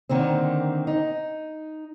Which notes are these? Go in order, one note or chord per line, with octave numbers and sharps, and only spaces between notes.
D3 D#3 A#3 C4
D#4